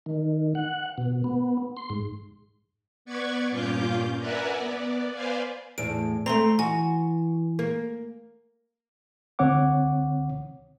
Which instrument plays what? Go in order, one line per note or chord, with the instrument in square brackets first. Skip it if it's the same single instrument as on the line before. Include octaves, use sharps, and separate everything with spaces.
[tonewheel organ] D#3
F#5
B2
B3
C6
G#2
[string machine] B3 B4 D5 C#6 G#6
G2 A#2 C#4 F4 D6 G6
A#4 B4 D5 E5 F#5 G#5
B3 D5
B4 C5 D5 F5 G#5
[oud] E2 A2 [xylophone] D7
[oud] A3 C4 [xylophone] A#5 C6
[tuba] E3 [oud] F#4 [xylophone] G#5
[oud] A#3
[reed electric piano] C#2 D3 C4 C#5 F#5 D6